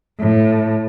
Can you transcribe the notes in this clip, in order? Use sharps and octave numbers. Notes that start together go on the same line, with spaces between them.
A2